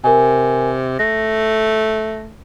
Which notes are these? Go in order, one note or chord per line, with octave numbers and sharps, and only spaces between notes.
C3 A#4 G#5
A3 A#6